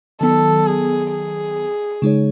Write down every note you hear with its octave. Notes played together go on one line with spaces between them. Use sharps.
D#3 F#3 B3 A4
G#4
G#4
C#3 G#3 D#4 G#4 C#5